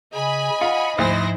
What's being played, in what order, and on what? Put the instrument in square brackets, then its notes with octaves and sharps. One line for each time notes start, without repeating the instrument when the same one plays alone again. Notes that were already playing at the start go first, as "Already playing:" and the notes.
[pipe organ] C#3 [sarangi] D#5 [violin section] G#5 B5
[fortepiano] F4 [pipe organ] F#5
[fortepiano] D2 [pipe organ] G#2 F3 [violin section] E4 C5 A#6